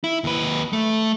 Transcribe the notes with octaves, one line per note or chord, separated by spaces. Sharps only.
E4
D#2 B4
A3